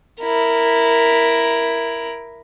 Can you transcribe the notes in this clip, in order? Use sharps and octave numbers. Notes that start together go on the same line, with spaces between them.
E4 A#4